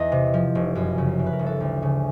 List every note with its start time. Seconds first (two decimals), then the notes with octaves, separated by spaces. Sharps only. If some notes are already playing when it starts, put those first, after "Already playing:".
Already playing: E2 D#5
0.12 C3
0.34 F3
0.55 F1
0.75 F#2
0.98 C#3
1.19 E3
1.26 B4
1.33 A#4
1.39 G1
1.46 A4
1.61 D2
1.82 C#3